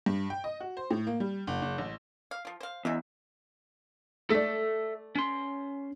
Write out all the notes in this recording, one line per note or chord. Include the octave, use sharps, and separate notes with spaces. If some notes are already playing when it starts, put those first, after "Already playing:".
G2
G5
D#5
F#4
C5
A2
A#3
G3
F#1
F#1
A1
F5
F3 F4
C5 F5
E2 C#3 D#4 E5
A3 A4 D5 E5
C#4 C6